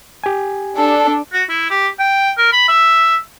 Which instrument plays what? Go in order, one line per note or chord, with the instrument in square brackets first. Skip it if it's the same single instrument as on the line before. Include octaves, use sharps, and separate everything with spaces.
[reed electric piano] G4 G#5
[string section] D4 [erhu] A4
[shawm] F#4
E4
G4
G5
A#4
B5
E5